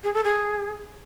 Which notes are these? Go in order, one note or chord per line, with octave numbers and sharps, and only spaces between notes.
G#4
A4
G#4